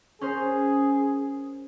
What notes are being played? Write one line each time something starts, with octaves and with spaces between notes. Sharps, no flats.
C#4 G#4 A#4 C5